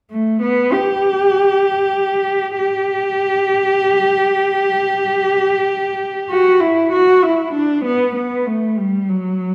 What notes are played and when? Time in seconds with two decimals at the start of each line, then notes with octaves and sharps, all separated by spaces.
0.11 A3
0.42 B3
0.72 G4
2.59 G4
6.30 F#4
6.61 E4
6.92 F#4
7.23 E4
7.54 D4
7.85 B3
8.16 B3
8.46 A3
8.77 G3
9.09 F#3